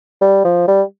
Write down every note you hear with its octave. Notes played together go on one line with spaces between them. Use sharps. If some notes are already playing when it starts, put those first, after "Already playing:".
G3
F3
G3